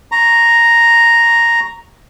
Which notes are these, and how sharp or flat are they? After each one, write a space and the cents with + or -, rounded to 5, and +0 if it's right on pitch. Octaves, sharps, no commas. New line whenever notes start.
A#5 +0 C#6 +0